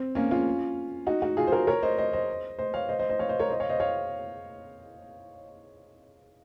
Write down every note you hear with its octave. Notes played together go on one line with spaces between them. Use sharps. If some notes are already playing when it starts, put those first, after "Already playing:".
Already playing: C4
A#3 C#4
C#4 F4
D#4 F#4
D#4 F#4
F4 G#4
C5
F#4 A#4
A#4 C#5
C5 D#5
C5 D#5
C5 D#5
C5 D#5
C#5 F5
C5 D#5
C5 D#5
C5 D#5
C#5 F5
C5 D#5
A#4 C#5
C5 D#5
C#5 F5
C5 D#5
C#5 F5